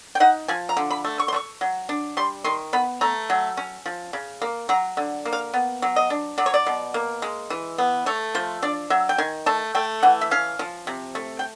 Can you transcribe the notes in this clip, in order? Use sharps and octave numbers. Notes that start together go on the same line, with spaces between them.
G5
D#4 F#5
F3 G#5
A#5
D3
B5
A3
C#6
C6
A3
C#6
F#3
D4
G3 C6
D#3 C6
B3 B5
A3 A#5
F#3
C#4
F3
C#3
A#3
F#3 A#5
D3
A#3
F5
B3
F#3
D#5
D4
F#3 D5
C#5
D5
B2
A#3
G#3
E3
B3
A3 C#5
F3 C5
D4 D5
F#3 E5
G5
D#3 G#5
A3 A5
A3 G5
E3 F#5
E5
C#4 F5
F3
C3
A3
G5